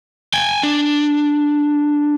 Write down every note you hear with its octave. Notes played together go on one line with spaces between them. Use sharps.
G5 G#5
D4